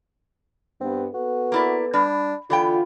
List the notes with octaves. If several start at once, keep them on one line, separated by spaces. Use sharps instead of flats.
G2 B3 C4
B3 F#4 A4 B4
A#3 E4 D5
G3 D4
D3 E3 B3 F4 G5